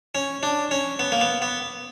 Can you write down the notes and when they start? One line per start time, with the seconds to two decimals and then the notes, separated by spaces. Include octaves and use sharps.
0.15 C#4
0.43 D4
0.71 C#4
0.99 B3
1.12 A#3
1.21 B3
1.42 B3